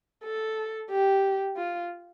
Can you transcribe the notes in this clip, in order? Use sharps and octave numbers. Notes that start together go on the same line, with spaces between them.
A4
G4
F4